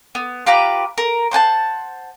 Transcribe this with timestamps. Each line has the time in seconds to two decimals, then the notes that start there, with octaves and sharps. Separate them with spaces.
0.15 B3
0.46 F4 G4 B4 A#5
0.98 A#4
1.31 C5 F#5 G#5 A5